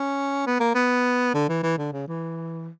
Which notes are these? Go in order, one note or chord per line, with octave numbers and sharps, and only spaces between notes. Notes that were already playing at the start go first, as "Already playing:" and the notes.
Already playing: C#4
B3
A#3
B3
D3
E3
E3
D3
C#3
E3